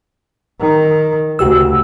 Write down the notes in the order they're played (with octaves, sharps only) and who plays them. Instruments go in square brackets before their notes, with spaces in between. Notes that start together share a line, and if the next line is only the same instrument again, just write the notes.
[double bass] D#3
[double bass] D2 C#3 [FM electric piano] F#4 G4 E6